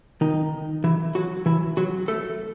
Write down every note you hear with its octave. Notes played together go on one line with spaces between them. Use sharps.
D#3 D#4
E3 E4
F#3 F#4
E3 E4
F#3 F#4
A3 A4